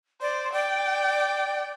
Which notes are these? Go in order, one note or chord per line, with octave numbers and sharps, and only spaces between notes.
C5 D5
D5 G5